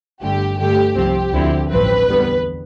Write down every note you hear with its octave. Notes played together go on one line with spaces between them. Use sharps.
G1 G2 D3 A3 G4
G2 D3 A3 G4
C2 C3 F3 C4 G4
D2 D3 F3 C4 E4
A1 G2 F3 C4 B4
E2 D3 G3 B3